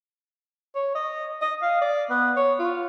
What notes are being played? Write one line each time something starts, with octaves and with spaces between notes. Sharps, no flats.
C#5
D#5
D#5
F5
D5
B3
C#5
F4